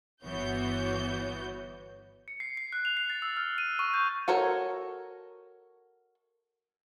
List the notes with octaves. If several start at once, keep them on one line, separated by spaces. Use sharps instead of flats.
G1 E3 B3 F#4 C#5 G6
C#7
C7
C7
F#6
F7
C7
A6
E6
F6
D#7
C#6
G6
F#4 A4 A#4 C#5